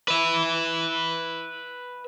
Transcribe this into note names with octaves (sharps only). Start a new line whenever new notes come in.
B4 E5